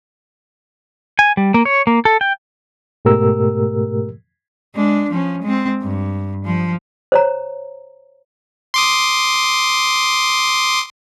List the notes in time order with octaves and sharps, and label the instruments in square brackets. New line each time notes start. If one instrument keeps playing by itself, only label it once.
[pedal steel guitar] G#5
G3
A#3
C#5
A#3
A4
G5
[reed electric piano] G#2 B2 A3 G4 A#4 E6
[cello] G#3 D4
F3 C#4
G#3 C4
G2
F3
[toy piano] C5 C#5 A#5
[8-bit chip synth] C6 D6 D#6